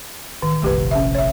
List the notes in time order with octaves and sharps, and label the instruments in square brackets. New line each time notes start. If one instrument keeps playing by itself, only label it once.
[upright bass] A1 [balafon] D#3
[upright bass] F1 A#1 [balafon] A3 G4 B4
[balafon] C#4 E5
C#5 E5